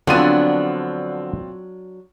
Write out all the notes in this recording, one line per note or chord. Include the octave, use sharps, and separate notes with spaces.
D3 F3 F#3 B3 C4 D4 F4 D#7